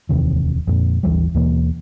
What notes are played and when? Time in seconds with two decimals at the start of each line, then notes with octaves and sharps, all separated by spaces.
0.09 D1 E2 C3 D#3
0.67 F2 A#2
1.03 A1 D#2 E3 G3
1.34 D#2 B2 E3 A#3